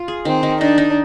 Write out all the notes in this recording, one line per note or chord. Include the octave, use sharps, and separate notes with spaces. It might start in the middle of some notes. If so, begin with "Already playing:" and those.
Already playing: F4
G#4
D#3 C4
D#3
D4 D#4
D#4